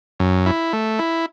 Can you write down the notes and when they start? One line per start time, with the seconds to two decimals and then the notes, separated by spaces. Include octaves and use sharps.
0.20 F#2
0.46 E4
0.73 A3
0.99 E4